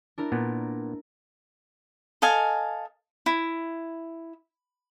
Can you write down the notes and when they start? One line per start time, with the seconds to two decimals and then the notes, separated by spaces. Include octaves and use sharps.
0.18 D4 E4 A#4
0.32 A#2 B3
2.22 A4 D#5 F5 G#5
3.26 E4